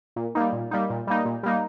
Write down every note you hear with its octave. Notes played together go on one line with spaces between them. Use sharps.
A#2
G3 A#3 D#4
A#2
G3 A#3 D#4
A#2
G3 A#3 D#4
A#2
G3 A#3 D#4